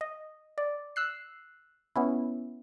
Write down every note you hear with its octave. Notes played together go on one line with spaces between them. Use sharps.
D#5
D5
E6 F#6 C7
B3 C#4 E4